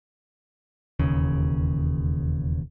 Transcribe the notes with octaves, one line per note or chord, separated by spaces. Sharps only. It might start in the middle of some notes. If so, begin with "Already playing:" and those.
E1 D#2 C#3